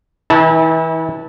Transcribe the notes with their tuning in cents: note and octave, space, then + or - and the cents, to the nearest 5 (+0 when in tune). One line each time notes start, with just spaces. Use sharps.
E3 -30 E4 -45 A5 +0